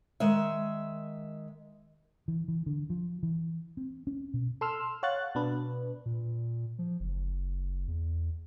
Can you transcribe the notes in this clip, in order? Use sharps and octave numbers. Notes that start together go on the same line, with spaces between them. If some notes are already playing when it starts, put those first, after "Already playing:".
D#3 G#3 E5
E3
E3
D3
F3
E3
C4
C#4
B2
A4 C6 E6 F6
C#5 F5 F#5 F#6 A6
B2 D4 B4
A#2
F3
F#1
E2